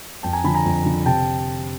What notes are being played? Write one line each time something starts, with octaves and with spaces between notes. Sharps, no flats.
F2 G5 A5
G#5 A#5
D3 F3 A5 B5
G#5 A#5
F2
D3 F3
C3 G5 A5